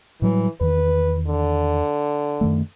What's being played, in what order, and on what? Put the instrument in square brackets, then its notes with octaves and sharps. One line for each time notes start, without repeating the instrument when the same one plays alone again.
[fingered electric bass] A2 F#3 G3 [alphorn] E3
[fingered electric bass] E2 D#3 [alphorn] B4
[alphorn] D3
[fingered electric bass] F#2 D#3 A3